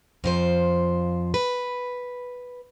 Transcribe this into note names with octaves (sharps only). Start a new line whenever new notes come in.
F2 F3 C5
B4